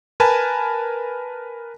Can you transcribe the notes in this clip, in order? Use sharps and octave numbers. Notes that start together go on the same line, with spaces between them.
A#4 B4 G#5 A5